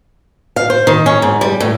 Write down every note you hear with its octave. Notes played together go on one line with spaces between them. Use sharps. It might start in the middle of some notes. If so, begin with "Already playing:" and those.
F5
C5
D#3
C#4
G#2
G3
A2